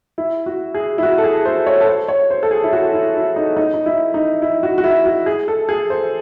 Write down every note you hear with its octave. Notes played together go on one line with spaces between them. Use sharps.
E4
F#4
G#4
E4
F#4
A4
G#4
C5
C#5
A4
C5
C#5
C5
A4
G#4
E4
F#4
E4
E4
D#4
D#4
D#4
E4
D#4
E4
F#4
F#4
E4
F#4
G#4
A4
G#4
C5